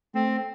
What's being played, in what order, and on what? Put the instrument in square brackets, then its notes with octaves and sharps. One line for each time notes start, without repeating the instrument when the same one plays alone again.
[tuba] A3 [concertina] C4